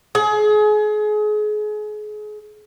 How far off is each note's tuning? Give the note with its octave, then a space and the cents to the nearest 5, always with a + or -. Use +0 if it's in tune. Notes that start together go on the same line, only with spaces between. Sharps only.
G#4 +30